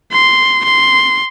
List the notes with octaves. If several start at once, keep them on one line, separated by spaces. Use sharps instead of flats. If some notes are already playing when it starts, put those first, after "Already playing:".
C6
C6